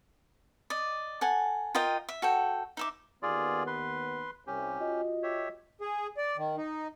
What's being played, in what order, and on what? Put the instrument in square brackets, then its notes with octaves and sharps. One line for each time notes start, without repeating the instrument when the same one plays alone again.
[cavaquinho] D5 D#5
A4 F#5 G#5
F4 A#4 D#5 G5
E5
F#4 A4 G5
D#4 E5 D6
[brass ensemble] D#2 B3 [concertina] F4 G#4 D5
[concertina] B4 C6
[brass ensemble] C2 [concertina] C#4 G4
[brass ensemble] F4 F#4 D#5
[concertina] G4 C#5 E5
[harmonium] G#4
D5
D#3
D#4